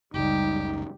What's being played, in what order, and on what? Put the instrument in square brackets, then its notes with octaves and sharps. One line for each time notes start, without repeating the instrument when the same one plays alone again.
[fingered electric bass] F#1 C#2 [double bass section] C#3 G3 [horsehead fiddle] D#4 [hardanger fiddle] G4